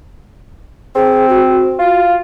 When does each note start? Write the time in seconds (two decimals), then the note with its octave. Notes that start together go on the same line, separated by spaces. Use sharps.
0.95 C4 G#4
1.29 F#4
1.79 F4